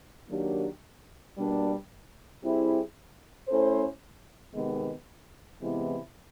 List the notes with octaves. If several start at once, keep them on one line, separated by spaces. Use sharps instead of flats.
D#3 F#3 A#3 D4 G4
B2 G3 A#3 D4
G3 C4 E4 G#4
A3 C#4 E4 A4 C5
C3 D#3 G#3 B3
C3 E3 G#3 B3 E4